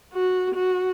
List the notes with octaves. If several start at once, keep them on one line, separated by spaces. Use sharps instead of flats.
F#4
F#4